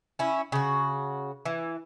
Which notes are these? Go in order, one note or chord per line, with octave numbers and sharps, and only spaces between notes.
C#4 E4
C#3 F#4
E3